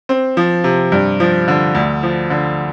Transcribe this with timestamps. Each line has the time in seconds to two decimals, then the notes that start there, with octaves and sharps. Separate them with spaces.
0.09 C4
0.37 F3
0.64 C3
0.92 G2
1.20 F3
1.48 D3
1.75 D2
2.03 F3
2.30 D3